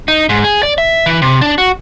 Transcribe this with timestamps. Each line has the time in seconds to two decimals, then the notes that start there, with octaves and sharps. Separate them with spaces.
0.08 D#4
0.29 G#2
0.44 G#4
0.63 D5
0.78 E5
1.06 E3
1.22 C3
1.41 D4
1.58 F#4